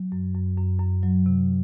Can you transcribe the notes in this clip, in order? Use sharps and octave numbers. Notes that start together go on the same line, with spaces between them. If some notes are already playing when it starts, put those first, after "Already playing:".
Already playing: F#3
F#2
F#2
F#2
F#2
F#3
C3